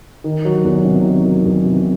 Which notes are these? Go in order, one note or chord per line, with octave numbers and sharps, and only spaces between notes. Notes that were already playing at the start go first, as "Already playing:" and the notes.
D#3
F#3
E2
C3
D#3
F#3
E2
C3